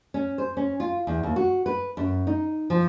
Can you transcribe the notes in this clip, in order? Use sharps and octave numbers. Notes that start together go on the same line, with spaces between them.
C#4
C5
C#4
F4
E2
D#2
F#4
B4
F#2
D#4
F3